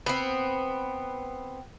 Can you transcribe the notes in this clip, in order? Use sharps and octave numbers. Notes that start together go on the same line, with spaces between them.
B3 C4